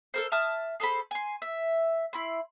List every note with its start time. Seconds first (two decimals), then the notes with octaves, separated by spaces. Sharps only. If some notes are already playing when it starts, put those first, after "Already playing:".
0.14 A4 A#4 C5
0.32 E5 A5 D#6 F6
0.80 G#4 A4 C5 B5
1.11 G#5 C6
1.42 E5
2.13 E4 B5 C6